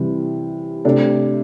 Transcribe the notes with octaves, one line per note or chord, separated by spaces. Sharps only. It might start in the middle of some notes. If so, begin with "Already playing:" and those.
Already playing: C3 E3 G3
C3 A3 D4